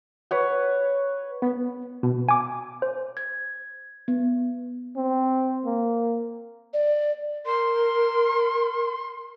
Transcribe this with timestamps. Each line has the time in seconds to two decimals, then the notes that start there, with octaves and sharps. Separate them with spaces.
0.31 B4 C#5 F#5
1.42 B3
2.03 B2
2.29 G#5 D6
2.82 C5
3.17 G#6
4.08 B3
4.96 C4
5.66 A#3
6.73 D5
7.46 A#4 C6